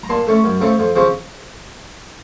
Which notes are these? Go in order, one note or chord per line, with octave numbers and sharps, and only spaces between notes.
A#5
A#2 A5 C6
A3 C#4
F#2
C#3 A3 C4
F2
C#3 F3 C4